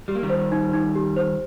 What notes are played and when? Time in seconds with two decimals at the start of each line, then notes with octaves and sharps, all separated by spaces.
0.08 G3 G4
0.15 A#3
0.23 D#3 G3
0.30 C5
0.52 D#4
0.73 D#4
0.96 G4
1.17 C5